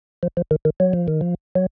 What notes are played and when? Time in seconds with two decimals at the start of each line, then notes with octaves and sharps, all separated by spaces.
0.23 F3
0.37 F3
0.51 D#3
0.65 D#3
0.80 F#3
0.93 F3
1.08 D#3
1.21 F3
1.55 F#3